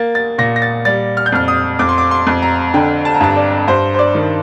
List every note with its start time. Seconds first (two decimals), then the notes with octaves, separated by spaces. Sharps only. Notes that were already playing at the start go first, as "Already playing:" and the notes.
Already playing: A#3 A6
0.15 A6
0.38 A#2 A#6
0.56 A#6
0.62 A6
0.85 G3 A6
1.17 F6
1.26 G6
1.32 F2 F6
1.48 D#6
1.79 F2 D6
1.89 C6
1.98 D6
2.11 C6
2.27 F2
2.42 A#5
2.74 D3 G5
3.05 A5
3.15 A#5
3.21 G2 A5
3.36 D5
3.68 G2 C5
3.94 C5
3.99 D5
4.15 D#3